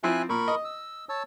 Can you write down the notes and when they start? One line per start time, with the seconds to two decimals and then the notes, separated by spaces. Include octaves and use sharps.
0.03 F3 C4 E4 E5 G#5 F#6
0.29 A#2 A#4 B5 C#6
0.48 D#5
0.65 E6
1.09 C#5 A5 E6